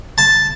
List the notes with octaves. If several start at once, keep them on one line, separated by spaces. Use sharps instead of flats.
A5